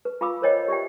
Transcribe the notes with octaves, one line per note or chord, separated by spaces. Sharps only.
B4
F4 F5 B5 D6 E6
A#4 C5 C#5 D#5 G5
G4 D5 E5 G5